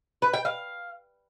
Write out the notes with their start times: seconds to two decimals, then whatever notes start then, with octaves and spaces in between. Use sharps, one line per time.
0.22 B4
0.33 G5
0.45 F5